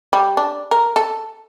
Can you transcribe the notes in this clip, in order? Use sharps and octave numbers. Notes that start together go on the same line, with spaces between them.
G3
D4
A#4
A4